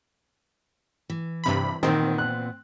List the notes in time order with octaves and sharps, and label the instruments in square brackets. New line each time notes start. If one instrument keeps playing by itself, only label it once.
[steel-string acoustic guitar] E3
[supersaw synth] G2 C3 B5
[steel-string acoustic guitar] A#2 B3 [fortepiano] D#3 [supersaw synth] C4
[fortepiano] F#6